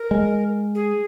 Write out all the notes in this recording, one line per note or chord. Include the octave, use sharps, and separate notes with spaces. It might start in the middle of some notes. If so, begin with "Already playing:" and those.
Already playing: A#4
G#3
G#4